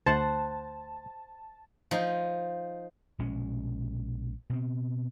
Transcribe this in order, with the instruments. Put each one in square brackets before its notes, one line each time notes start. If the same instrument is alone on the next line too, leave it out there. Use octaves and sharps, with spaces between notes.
[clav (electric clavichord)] D2 [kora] C5 F#5 [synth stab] A5
[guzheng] F3 D#4
[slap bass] A#1 B2 G#3 C#4
B2 C4